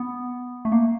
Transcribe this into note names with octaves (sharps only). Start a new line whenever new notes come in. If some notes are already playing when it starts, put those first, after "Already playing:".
Already playing: B3
A3
A#3